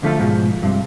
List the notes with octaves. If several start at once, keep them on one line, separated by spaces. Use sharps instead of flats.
D3 F3 A3 B3 F4 A4
G#2 B2 F3
G2 C3